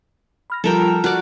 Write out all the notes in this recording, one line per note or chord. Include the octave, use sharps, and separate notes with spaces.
B5 F6 A#6
F3 G3 F4 A4 A#4 G5
F#4 A#4 D5 F6 F#6